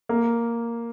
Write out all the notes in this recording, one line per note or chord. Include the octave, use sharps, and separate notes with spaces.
A#3